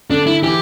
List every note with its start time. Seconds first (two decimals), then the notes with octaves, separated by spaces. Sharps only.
0.10 D3 D4
0.26 E4
0.43 E3 G4